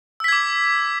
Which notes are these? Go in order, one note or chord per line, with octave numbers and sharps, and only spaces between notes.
D6 E6 G#6 B6